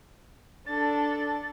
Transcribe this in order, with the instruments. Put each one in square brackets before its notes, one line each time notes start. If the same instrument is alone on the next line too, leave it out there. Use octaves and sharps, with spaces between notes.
[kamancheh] D4 A4 [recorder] A6